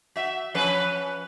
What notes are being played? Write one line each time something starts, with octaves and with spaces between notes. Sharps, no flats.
F#4 E5
F3 C#4 B4